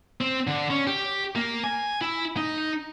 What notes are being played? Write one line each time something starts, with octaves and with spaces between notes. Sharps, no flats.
C4
D3
C#4
G4
A#3
G#5
E4
D#4